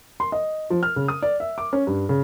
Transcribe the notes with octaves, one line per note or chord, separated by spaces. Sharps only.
C6
D#5
F3
F6
C#3
D#6
D5
E5
D6
C#4
G2
C#3